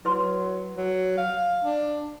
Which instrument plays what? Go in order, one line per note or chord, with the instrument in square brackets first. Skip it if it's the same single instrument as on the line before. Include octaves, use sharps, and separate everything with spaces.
[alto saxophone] F#3 [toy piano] E4 B4 C6
[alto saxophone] F#3
F5
D4